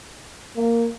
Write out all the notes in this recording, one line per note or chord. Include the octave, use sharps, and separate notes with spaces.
A#3